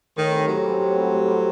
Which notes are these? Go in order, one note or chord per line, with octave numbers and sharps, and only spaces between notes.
A2 D#3
G3 C4
A2 F#3
G3 C4
A2
G3 C4
A2
G3 C4